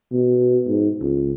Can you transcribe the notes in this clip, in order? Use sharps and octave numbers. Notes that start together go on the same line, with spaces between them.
B2
G#2
C#2